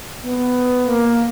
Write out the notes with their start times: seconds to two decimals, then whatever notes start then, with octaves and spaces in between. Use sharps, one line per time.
0.23 B3
0.86 A#3